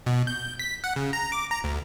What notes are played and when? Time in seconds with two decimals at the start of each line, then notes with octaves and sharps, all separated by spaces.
0.06 B2
0.27 G6
0.59 B6
0.84 F#5
0.96 C#3
1.13 A#5
1.32 D6
1.51 A#5
1.64 D2